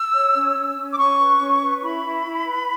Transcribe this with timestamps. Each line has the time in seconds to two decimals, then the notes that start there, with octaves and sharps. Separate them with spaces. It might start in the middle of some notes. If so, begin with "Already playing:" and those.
Already playing: E6
0.14 C#5
0.35 C#4
0.55 C#4
0.76 C#4
0.92 D6
0.98 C#4 C#6
1.20 B4
1.40 C#4
1.61 B4
1.83 E4 B5
2.04 E4
2.26 E4
2.47 B4